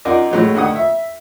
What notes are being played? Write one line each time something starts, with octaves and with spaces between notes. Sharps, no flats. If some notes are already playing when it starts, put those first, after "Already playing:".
F#2 D#4 F4 A#4 D5
A2 F#3 G#3
D2 D#3 F#5 D#6
E5